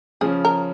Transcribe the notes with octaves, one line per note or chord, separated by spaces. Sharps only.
C#3 F3 G#4
A#4